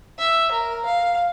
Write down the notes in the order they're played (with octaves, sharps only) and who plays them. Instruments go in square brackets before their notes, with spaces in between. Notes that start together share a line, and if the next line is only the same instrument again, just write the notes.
[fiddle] E5
A#4
F5